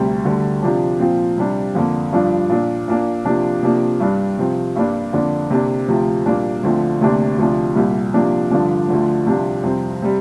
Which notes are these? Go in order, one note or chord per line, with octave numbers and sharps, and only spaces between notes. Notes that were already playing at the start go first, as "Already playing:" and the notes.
Already playing: D2 C3 G3 C4
D2 D3 G3
C3 F3 D4
A#2 F3 C4
C3 G3 D4
F2 D3 A#3
G2 F3 D4
A#2 A#3 D4
A#2 A#3 D4
C3 F3 A#3 D4
C3 F3 A#3 D4
G2 G3 D4
C3 F3 C4
G2 G3 A#3 D4
F2 D3 A#3 D4
C3 A#3 D4
D2 C3 F3 C4
A#2 G3 A#3 D4
D2 D3 F3 C4
D2 C3 A#3 D4
D2 C3 F3 D4
C2 A#2 G3 A#3
C3 F3 A#3 D4
G2 D3 F3 D4
D2 D3 F3
C2 C3 F3 D4
F2 C3 G3 C4
C3 G3